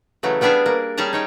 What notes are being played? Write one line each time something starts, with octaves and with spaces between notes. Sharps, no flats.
C#3 E3 F#3 A3
G3 B3 D4 G#4 E5 F5
A#3
G3 C#4 G#4 A5 A#5
D#4 C#5 G5